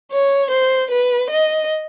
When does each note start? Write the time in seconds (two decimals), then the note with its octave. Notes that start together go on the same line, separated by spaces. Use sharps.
0.12 C#5
0.51 C5
0.91 B4
1.31 D#5